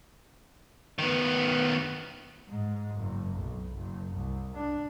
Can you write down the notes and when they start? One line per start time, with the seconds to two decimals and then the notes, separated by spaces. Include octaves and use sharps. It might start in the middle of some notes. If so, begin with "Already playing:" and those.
0.99 D#3 B3
2.49 G#2 G#3
2.96 F#1
3.38 B1
3.73 F#1
4.15 C2
4.55 D4